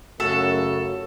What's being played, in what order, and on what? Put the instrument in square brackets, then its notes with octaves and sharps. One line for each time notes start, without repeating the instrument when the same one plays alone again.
[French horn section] F#2 C#3 A3 [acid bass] F#4 [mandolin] A4